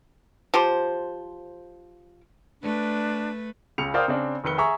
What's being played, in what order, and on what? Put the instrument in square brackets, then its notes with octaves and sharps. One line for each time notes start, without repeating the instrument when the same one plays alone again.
[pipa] F3 G4 C5
[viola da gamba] A3 B4 [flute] D4
[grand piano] C#2 C#3 C#7 F7
A#4 C5 D5 F5 G5 D#6
C#3 C4 D4
F1 D#3 B4 C#7 G7
G#4 E5 G#5 A#5 C#6